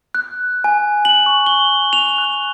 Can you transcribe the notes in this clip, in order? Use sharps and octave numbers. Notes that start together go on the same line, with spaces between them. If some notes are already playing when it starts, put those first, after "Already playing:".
F#6
G#5
F#7
C#6
G7
F7
F#6